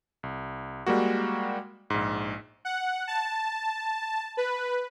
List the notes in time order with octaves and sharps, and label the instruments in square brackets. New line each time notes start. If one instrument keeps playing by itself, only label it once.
[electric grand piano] C2
G3 G#3 A#3 F#4
A#1 G#2
[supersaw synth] F#5
A5
B4